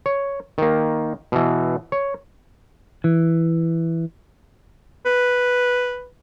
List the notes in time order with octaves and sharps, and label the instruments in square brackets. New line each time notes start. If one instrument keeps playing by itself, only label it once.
[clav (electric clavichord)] C#5
D#3 A#3
B2 E3
C#5
[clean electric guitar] E3
[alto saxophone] B4